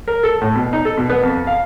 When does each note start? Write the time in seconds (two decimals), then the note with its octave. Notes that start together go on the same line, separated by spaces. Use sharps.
0.08 A#4
0.23 A4
0.41 A2
0.55 B2
0.73 D#4
0.85 A4
0.97 B2
1.10 B3
1.23 F2
1.47 F5